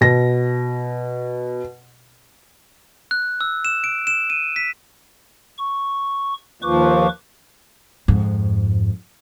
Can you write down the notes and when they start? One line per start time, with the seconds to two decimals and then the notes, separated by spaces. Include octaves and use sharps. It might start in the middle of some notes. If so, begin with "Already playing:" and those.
0.01 B2 A#6
3.11 F#6
3.41 E6
3.65 E7
3.84 D7
4.07 E7
4.30 D#7
4.56 B6
5.58 C#6
6.62 D#2 F3 B4 C#6 D6
8.08 F2 G#2